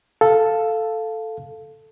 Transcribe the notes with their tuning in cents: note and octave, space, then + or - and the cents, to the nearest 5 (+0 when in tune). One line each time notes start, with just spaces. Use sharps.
A4 +0 F5 +0